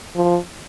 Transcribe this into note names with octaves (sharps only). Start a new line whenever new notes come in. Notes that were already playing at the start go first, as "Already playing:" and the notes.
F3